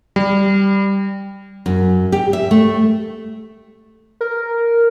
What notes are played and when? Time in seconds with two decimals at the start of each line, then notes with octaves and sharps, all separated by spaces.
0.16 G3
1.66 F#2
2.12 G4
2.33 E5
2.51 A3
4.21 A#4